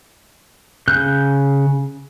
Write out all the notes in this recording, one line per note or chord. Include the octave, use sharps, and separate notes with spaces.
C#3 F#6 G6